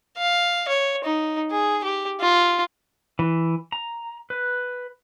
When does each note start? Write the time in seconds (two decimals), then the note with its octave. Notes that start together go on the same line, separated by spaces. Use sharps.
0.18 F5
0.68 C#5
1.04 D#4
1.51 G#4
1.84 G4
2.21 F4
3.19 E3
3.72 A#5
4.30 B4